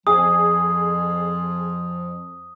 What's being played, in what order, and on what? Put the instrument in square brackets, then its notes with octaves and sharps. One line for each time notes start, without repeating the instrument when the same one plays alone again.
[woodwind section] F2 F3 [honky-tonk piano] G#4 [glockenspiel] D#6